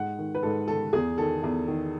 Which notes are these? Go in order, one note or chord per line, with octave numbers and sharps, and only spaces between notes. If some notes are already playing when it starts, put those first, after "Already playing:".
Already playing: G#2 F#5
D#3
B4
G#2 A4
D#3 A4
E2 G#4
D#3 A4
E2
D#3